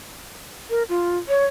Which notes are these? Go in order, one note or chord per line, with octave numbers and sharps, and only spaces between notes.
A#4
F4
C#5